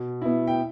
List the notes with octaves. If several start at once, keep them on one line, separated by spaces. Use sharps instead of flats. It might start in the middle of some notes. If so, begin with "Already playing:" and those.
Already playing: B2
B3 E4
G5